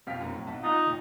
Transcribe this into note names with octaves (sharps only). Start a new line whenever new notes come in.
F2 B2 C4 F5 F6 B6
F1 F#2 A#5
A2 F#3
B1 F#5 A5
D#4 F4 D5 F#6
G#1 D#2